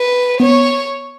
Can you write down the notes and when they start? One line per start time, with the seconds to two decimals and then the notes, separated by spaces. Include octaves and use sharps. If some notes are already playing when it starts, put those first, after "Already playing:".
Already playing: B4
0.40 B3 C#5